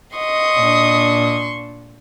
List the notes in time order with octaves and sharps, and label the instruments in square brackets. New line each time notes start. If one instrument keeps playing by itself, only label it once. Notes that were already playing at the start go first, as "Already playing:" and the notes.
[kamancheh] D#5 D#6 [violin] C6 C#6
[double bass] A#2 D4